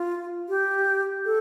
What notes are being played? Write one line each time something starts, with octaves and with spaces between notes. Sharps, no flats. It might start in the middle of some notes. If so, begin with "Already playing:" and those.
Already playing: F4
G4
A4